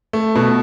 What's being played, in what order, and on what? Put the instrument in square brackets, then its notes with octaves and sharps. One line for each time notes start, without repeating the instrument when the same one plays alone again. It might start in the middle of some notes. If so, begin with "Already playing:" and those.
[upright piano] A3
B2